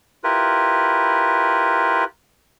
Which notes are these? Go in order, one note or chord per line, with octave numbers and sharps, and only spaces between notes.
E4 F4 G4 A#4 B4